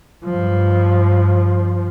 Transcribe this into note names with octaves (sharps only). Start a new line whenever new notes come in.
G2 F3